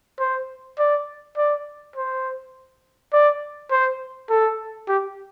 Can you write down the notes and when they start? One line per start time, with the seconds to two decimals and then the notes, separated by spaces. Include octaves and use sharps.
0.19 C5
0.78 D5
1.37 D5
1.96 C5
3.13 D5
3.71 C5
4.30 A4
4.88 G4